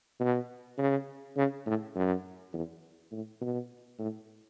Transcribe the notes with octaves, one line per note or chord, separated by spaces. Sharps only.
B2
C#3
C#3
A2
F#2
E2
A2
B2
A2